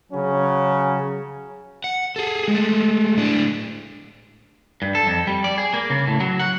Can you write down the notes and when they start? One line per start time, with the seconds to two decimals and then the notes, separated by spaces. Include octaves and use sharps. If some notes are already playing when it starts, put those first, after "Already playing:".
0.12 C#3 F#3 C#4
1.84 F#5
2.16 G#4 A4
2.48 G#3 A3
3.17 A2 D4
4.82 G2
4.95 A4
5.07 F2
5.27 G3
5.44 D5
5.58 G#4
5.74 A#3
5.90 C#3
6.07 A2
6.20 F#3
6.39 F#5